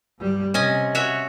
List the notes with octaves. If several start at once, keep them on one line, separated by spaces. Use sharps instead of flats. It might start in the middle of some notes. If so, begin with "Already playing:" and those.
G2 G3
C3 C#4 D#5 G#5
F#4 C#5 E5